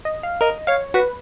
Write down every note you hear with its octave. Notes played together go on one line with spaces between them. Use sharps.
D#5
F5
A#4 D#5
C#5 F5
F#4 B4